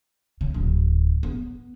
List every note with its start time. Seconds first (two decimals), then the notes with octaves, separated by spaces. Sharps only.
0.41 C#3
0.54 D1
1.23 B3